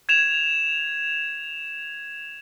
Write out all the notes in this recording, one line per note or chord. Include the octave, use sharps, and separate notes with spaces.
G#6 E7 F7